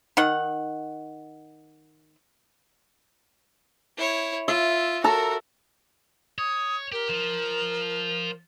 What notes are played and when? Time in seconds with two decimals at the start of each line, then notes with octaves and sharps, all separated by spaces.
0.17 D#3 D#4 F#5
3.98 E4 C#5
4.48 F4 E5
5.04 F#4 A4 A#4 A#5
6.39 C#5 D#6
6.92 G4 A#4
7.09 F3